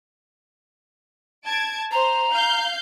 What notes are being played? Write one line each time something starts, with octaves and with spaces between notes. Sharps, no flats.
A5 G#6 D7
C5 A#5
F5 G6